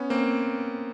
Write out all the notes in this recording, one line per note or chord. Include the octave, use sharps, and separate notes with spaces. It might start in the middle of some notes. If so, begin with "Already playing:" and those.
Already playing: B3 C#4
A#3 C4